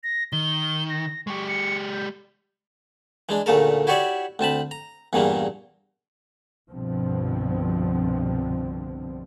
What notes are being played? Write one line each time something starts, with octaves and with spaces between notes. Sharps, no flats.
A#6
D#3 G7
A#6
G#3 G4 C#6
C#7
G6
E3 G#3 D4
D2 A#2 C#3 A3 A4 A#4
E4 F#4 G4 C#5 D5 E5
D2 C4 A5 B5
A#5
E2 G2 A#2 C#3 E3 A#3
C2 G2 B2 D3 F3 C4